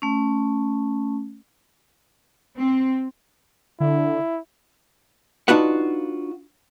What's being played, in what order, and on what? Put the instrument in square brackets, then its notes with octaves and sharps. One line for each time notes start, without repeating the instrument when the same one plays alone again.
[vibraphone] A3 C#4
[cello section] C4
[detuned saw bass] D3 [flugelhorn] E4
[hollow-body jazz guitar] D4 D#4 F4 F#4 B4 F#5